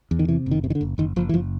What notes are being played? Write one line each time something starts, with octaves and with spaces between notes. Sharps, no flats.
E2
D#3
C3 E3
F#1
D#3
C3
D#3
D3
F#1
F#1 D#3
F#1 F3
E3
F#1 F3